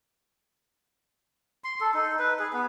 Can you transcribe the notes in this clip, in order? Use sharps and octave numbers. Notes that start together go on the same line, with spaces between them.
C6
A4
D#4
B4
G#4
B3